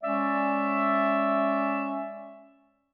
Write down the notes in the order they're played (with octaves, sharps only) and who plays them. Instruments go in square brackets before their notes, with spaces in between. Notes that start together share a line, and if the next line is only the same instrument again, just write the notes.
[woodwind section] G#3 C#4 D5 E5